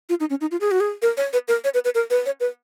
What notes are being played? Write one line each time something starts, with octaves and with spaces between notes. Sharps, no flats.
F4
D#4
C#4
D#4
F4
G#4
F#4
G#4
A#4
C#5
B4
A#4
C#5
B4
B4
A#4
B4
C#5
B4